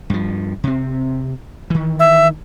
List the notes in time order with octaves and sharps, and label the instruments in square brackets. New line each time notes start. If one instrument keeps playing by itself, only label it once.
[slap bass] G2 F3
C3 C4
D#3 E3
[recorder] E5